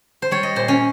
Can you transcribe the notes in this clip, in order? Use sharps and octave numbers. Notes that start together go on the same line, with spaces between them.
C5
G3 C#5
D#5
A#2 C5
C#4